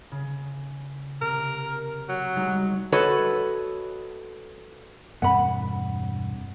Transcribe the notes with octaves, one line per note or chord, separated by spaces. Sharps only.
C#3
C3 A#4
F#3
G3 G#3 D#4
F#4 A4 B4 C#5 D#5
E1 G2 C4 F#5 B5